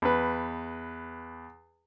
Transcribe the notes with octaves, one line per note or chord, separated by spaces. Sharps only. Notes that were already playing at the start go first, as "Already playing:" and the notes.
E2 B4